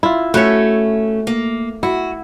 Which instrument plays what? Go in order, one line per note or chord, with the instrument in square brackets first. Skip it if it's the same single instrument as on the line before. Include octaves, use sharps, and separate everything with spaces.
[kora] E4 F4
[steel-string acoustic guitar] A3 C#4 [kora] F#4 B4 C#5
[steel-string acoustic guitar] A#3
[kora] E4 [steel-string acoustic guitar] F#4